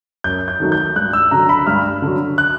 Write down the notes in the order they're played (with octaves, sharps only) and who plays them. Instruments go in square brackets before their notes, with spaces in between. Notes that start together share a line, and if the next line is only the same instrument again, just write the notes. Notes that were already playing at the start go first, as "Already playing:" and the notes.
[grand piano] F#2 G6
G6
D#3 F#3 A3
G6
G2 F#6
E6
D3 F#3 A#5
B5
G2 F6
D3 F#3
F#6